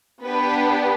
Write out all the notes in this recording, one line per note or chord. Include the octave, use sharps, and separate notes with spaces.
B3 D4 G4 B4